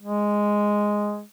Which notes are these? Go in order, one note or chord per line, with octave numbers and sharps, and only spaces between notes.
G#3